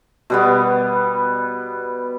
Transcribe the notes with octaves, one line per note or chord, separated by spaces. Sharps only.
B2 G3 B3